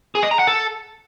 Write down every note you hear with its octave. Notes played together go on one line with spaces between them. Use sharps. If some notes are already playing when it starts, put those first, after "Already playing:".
G#4
D#5
A#5
F#5
A4